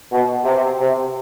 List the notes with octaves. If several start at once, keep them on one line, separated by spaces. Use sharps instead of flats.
B2
C3
C3